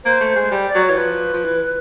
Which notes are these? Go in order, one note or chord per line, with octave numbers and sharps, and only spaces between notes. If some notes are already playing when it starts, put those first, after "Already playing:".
A#3 C5
A3
G#3
G3
D5
F#3
C#5
E3
F3 B4
F3
E3